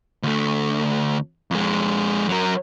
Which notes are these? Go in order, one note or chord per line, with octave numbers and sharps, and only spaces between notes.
D2 A3
F2 G#3
F#3 A#4